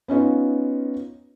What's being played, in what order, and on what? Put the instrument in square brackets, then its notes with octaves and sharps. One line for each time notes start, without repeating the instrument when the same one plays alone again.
[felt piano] B3 C#4 D#4 F4